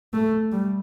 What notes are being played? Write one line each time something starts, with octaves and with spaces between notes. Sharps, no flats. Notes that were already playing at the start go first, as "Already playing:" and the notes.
A3
G3